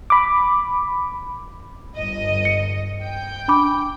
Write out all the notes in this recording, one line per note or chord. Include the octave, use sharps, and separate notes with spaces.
B5 D6
G1 D#5
C#7
G5
D4 B5 D6